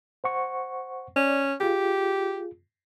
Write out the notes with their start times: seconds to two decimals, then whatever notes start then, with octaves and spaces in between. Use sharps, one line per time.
0.24 C5 F#5 C#6
1.16 C#4 D5
1.60 F4 G4 G#4